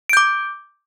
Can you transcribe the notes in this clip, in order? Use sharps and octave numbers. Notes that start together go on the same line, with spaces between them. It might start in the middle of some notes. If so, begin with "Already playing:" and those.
D6 G6 D7